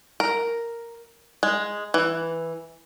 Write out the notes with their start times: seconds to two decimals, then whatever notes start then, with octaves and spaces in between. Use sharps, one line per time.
0.20 A#4
1.43 G#3
1.94 E3